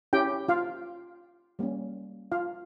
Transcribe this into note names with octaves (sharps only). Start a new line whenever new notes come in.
C#4 E4 G4 G5
F4 F5
G3 A#3 C#4
F4 F5